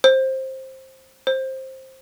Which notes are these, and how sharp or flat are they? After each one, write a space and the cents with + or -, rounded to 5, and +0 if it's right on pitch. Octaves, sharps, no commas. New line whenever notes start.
C5 +15
C5 +15